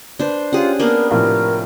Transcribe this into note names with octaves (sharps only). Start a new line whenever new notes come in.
D4 B4 C5
C#4 F4 G4 G#4 F#5
A#3 B3 D4 A#4
A2 C3 F3 A#4